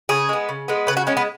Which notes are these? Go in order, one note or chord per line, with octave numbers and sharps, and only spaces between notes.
C#3 G#4
G#3 B3
C#3
G#3 B3
C#3 B4
F#4
G#3 B3 C#4
B3